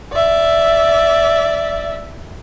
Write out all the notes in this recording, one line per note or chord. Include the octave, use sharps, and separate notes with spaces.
D5 E5